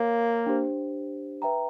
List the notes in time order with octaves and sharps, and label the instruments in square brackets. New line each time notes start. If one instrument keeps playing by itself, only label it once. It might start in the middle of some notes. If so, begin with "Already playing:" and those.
Already playing: [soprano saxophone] A#3 [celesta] A#4 C#5 F5
[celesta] D4 G4 C5
B4 E5 G5 A#5